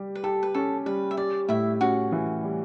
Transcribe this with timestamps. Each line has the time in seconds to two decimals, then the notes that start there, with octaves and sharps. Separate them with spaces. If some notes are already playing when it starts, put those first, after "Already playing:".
Already playing: G3 G4
0.15 B4
0.24 G4 A4
0.43 B4
0.55 C#4 A4
0.86 G3 B4
1.11 E5
1.17 G3 D5
1.49 A2 E4 E5
1.81 C#4 F#4 F#5
2.12 E3
2.43 G3